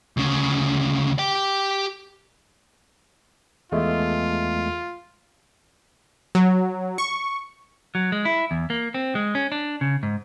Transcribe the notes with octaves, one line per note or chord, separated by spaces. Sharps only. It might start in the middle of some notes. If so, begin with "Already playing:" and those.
D2 C#3
G4 G5
E2 G#3 A3 F4
F#3
C#6
F#3
G#3
E4
E2
A#3
C4
G#3
C#4
D4
C#3
G#2